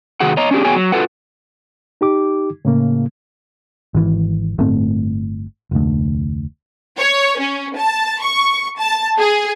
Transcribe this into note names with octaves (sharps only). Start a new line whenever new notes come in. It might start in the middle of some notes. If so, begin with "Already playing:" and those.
C3 D#3 F#4 G#4 F#5
C#5 D#5 A#5
C#4 D4 E4 G4 G#4
B3 F#4 G#4 C#5 G5 G#5
F#3
F4 F#4 A4 B4 F#5
D#4 G4 D6
A2 C#3 A#3
G#1 E3
G1 A2 A3 C4
F1 D2
C#5
C#4
A5
C#6
A5
G#4